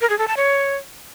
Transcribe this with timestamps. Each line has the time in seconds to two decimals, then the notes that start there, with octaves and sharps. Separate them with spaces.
0.01 A#4
0.10 G#4
0.19 A4
0.28 A5
0.37 C#5